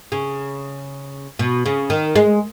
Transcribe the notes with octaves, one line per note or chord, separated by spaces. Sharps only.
C#3
B2
C#3
D#3
G#3